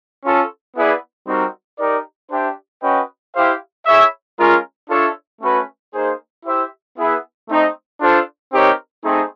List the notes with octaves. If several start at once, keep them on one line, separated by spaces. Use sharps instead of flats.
C#4 F4 A4
B3 E4 G#4 B4 D5
G3 C4 D#4 F#4 A#4
D#4 G4 A#4 D5
D4 G4 C5 E5 G5
C#4 F#4 B4 D#5 G5
E4 G4 C5 F5
E4 G#4 C#5 E5
G#3 C#4 F4 A#4
D4 F4 A4 C#5 E5
A3 C#4 F#4 B4
A#3 D#4 G#4 C5
E4 G4 C5 E5
B3 E4 G#4 B4 E5
A3 C4 D#4
D4 F4 A4 C5
C4 D#4 G4 A#4 C#5
A3 C4 D#4 G#4